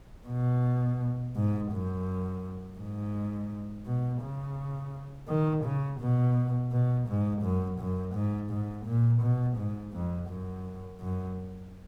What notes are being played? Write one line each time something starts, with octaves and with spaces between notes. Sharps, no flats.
B2
G#2
F#2
G#2
B2
C#3
D#3
C#3
B2
B2
G#2
F#2
F#2
G#2
G#2
A#2
B2
G#2
F2
F#2
F#2